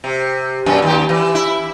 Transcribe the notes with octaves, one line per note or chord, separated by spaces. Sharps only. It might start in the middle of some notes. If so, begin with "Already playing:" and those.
C3
F#2 B2 C#4
D#2 G4
E3
E4